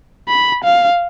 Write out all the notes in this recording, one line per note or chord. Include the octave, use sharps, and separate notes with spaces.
B5
F5